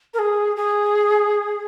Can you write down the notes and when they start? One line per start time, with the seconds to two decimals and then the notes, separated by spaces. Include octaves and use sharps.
0.14 A#4
0.19 G#4
0.56 G#4